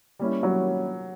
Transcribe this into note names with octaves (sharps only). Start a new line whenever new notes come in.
G3 A#3 C#4 E4
F#3